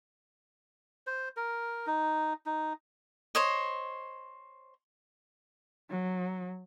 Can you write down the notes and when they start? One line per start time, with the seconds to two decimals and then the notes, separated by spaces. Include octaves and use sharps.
1.07 C5
1.37 A#4
1.87 D#4
2.46 D#4
3.35 C5 C#5 D#5
5.90 F#3